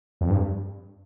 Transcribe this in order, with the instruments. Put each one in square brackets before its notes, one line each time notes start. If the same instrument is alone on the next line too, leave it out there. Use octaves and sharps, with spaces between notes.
[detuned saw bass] F2
G2